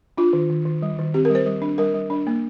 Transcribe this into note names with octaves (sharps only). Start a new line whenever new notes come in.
D4 F4
D#3
D#3
D#3
G3
D#3
C4 G4
A#4
G3
C5
G3
D4
G3 A#4
G3
D4
A#3